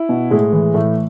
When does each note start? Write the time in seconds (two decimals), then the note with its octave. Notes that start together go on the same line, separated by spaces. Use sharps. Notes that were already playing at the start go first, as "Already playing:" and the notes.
Already playing: E4
0.09 B2
0.31 A2 G#3
0.52 E3
0.74 A2 A3